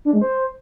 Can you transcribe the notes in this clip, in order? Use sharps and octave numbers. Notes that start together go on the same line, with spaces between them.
D4
G#3
C5